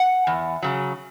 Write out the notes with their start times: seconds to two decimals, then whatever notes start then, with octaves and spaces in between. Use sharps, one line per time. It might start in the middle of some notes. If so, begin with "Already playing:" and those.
Already playing: F#5
0.27 E2
0.62 C#3 F#3